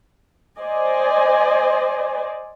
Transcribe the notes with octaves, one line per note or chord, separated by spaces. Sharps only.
C5 D5 D#5 G#5